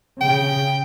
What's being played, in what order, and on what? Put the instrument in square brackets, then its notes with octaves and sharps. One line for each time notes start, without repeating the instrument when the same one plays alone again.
[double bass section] C#3 [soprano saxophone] G5